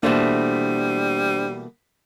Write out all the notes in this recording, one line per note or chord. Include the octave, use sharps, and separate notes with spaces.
B2 E3 G3 A3 A#3 D4 C5